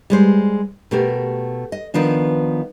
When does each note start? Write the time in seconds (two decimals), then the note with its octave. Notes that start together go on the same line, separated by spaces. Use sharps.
0.10 G3 G#3 C5
0.91 B2 A3 G4 A#4
1.72 D#5
1.94 D#3 F3 B3 D4